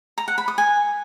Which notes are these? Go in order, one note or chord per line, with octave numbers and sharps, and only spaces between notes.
A#5
F#5
B5
D#6
G#5